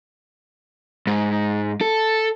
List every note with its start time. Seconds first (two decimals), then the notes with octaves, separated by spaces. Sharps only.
1.07 G#2
1.81 A4